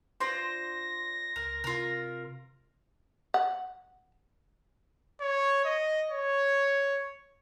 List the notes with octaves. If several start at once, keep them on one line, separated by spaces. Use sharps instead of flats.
D4 F4 C5 C6 A#6
C#2 A#4
C3 F4 A#4
F#5
C#5
D#5
C#5